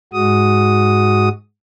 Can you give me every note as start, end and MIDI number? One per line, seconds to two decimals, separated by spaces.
0.13 1.29 44
0.13 1.29 56
0.13 1.29 66
0.13 1.29 87